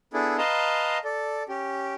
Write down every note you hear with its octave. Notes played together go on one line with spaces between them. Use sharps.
B3 D4 E4 G#4 A4
B4 D#5 F5 A5 A#5 C6
A4 D5
C#4 G4